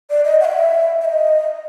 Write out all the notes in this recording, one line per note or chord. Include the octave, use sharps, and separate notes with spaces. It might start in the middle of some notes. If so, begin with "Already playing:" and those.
D5
D#5
F#5
E5
E5
D#5